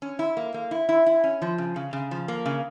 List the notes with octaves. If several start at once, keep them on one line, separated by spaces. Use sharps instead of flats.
C#4
E4
A#3
A#3
E4
E4
E4
C#4
F3
C#3
C#3
C#3
F3
A#3
C#3